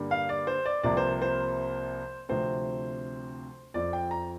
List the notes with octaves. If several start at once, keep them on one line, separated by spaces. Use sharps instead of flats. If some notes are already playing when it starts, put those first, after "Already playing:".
Already playing: G2 D3 G3 A#3
F5
D5
C5
D5
C2 C3 F3 A#3 D5
C5
C5
D2 C3 F3 C4 C5
F2 F3 C4 D5
G5
A#5